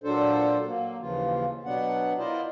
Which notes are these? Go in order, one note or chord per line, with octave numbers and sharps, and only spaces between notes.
A#2 F#3 D4 A4 C5
F#3 A#3
D#2 C#3 E3 F3 F4
B2 F#3 B3 D4 F#5
E4 F4 A#4 C5 D5 D#5